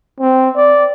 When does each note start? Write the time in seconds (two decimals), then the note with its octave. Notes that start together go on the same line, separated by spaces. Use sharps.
0.20 C4
0.56 D5